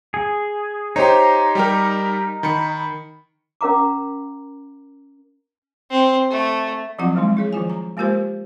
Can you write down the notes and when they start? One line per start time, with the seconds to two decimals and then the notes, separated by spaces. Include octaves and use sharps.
0.14 G#4
0.96 D#4 G4 C5 C#5
1.55 G3 G4 A#4
2.43 D#3 B5 C#7
3.61 C#4 A#4 F5 A#5 D6
5.91 C4
6.30 A3
6.99 F3 F#3 C4 E4 F4 F#5
7.15 D#3 G3 G#3 A#3 D#4
7.37 E4 G#4 C#5
7.53 D#3 F3 F4 G#5
7.70 A#5
7.97 G#3 A#3 F4 G4 A#4 C5